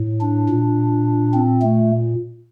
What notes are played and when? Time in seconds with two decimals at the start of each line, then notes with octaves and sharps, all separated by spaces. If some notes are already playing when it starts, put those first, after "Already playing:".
Already playing: A2
0.21 D4
0.50 A#2
1.34 C4
1.62 A3